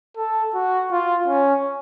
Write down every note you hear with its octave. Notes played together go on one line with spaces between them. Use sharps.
A4
F#4
F4
C#4